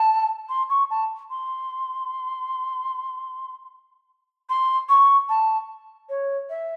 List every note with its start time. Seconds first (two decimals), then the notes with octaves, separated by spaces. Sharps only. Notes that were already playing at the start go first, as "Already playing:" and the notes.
Already playing: A5
0.49 C6
0.70 C#6
0.90 A5
1.30 C6
4.49 C6
4.89 C#6
5.29 A5
6.09 C#5
6.50 E5